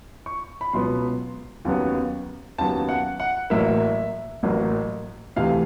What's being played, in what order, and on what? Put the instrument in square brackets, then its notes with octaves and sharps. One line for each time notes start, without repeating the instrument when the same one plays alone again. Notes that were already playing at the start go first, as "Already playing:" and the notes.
[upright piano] C#6
B5
C#2 B2 F#3 B3 C6
D#2 C#3 F#3 B3
D#2 C#3 F#3 B3 A5
F#5
F#5
A1 A2 F#3 A#3 E5
A1 A2 F#3 A#3
D2 C3 E3 A3 F5